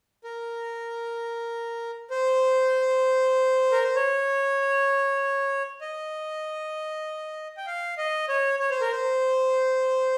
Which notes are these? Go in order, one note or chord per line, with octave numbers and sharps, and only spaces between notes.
A#4
C5
A#4
C5
C#5
D#5
G5
F5
D#5
C#5
C#5
C5
A#4
C5